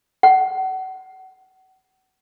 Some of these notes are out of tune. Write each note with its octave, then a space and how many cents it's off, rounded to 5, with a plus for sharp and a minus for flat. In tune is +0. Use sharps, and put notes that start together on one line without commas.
F#5 +30